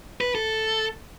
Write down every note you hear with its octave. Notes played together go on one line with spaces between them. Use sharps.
B4
A4